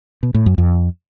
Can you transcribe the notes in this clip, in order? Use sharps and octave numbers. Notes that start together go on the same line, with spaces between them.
B2
A2
F#2
F2